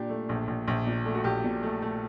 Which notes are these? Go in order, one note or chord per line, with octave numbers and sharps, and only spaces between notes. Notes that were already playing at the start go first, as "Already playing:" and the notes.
Already playing: A#2 D4 G4
A3
A#1
A#1
A#1
A#2
A3
F#4
A#1 G4
A#2
A3
A3